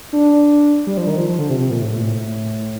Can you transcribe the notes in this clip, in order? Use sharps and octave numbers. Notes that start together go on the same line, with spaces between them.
D4
G3
F3
D#3
F3
F3
D3
C3
C3
A#2
A2
A#2
A2